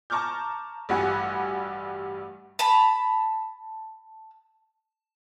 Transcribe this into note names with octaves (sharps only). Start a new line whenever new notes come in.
A5 A#5 C#6 D6 F6 G6
A1 G2 G3 F#4 F#5 G#5
A5 B5